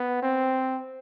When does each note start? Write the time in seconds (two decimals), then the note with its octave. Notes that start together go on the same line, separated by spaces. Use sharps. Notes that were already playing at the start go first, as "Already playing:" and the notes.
Already playing: B3
0.23 C4